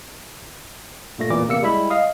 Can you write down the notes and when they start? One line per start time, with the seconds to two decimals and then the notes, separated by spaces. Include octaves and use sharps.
1.18 G2 A#2 A3 A#6
1.30 A1 E2 A#2 E3 D6
1.48 E2 C3 A#3 E6 C#7
1.62 G3 G#3 E4 E5 B5
1.90 D#5 F5 D#6